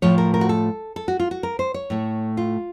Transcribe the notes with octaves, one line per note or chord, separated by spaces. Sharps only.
A2 F3 A3 C#5
A#4
A#4
F#4
A4
A4
F#4
F4
F#4
A#4
C5
C#5
A2 A3
F4